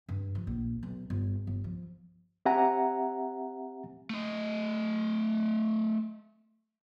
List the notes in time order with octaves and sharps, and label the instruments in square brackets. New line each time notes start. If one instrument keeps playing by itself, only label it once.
[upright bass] G2
F3
A#1
B1
G1
G1
F3
[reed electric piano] C4 G4 E5 F#5 G#5 A#5
[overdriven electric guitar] A3 D#5